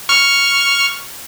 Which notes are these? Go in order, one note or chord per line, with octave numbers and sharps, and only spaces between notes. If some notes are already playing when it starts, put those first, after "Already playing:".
C#6 F6